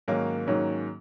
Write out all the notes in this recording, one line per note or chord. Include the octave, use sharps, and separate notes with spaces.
G#2 D#3 F#3 A#3 C#4
G#2 D#3 F#3 A#3 C#4